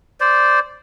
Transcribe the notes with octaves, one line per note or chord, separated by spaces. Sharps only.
C5 D5